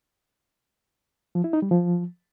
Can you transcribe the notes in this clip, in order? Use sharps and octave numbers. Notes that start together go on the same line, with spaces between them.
F3
E4
D#4
G3
F3